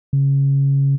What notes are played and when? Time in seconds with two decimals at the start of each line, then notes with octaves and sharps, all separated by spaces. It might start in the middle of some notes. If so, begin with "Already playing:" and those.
0.13 C#3